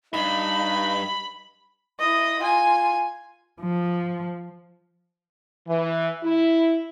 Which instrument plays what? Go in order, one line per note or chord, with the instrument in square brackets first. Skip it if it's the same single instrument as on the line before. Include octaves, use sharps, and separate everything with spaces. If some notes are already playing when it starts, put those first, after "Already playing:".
[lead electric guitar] G2 [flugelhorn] D#4 [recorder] B5
[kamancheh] E4 D#5
F4 G#5
[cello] F3
[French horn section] E3
E4